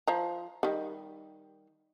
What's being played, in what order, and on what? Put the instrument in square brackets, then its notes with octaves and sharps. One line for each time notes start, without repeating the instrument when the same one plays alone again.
[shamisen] F3 C5 A#5
D#3 G3